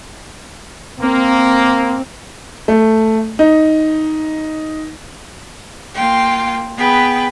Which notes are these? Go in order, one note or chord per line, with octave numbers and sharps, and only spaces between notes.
A#3 C4
A3
D#4
A#3 F4 G5
B3 G#4 B4 G5